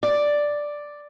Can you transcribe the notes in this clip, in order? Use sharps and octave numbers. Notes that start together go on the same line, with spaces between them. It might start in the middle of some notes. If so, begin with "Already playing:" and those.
D5